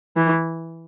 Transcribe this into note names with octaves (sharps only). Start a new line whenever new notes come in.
E3